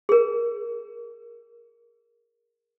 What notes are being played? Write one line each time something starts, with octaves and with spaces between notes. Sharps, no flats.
G#4 A#4